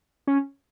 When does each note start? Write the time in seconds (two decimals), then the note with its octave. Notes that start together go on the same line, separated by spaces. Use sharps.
0.27 C#4